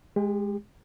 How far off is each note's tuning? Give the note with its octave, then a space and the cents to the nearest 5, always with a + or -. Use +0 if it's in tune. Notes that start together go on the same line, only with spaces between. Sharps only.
G#3 +0 G4 +35